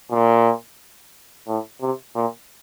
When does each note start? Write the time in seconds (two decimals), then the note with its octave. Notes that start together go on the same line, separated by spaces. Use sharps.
0.11 A#2
1.48 A2
1.81 C3
2.15 A#2